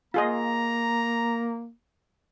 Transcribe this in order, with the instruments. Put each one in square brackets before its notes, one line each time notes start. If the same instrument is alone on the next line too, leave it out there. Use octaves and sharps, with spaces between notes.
[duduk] A#3 [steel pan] F4 G#4 D#5 [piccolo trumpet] A#5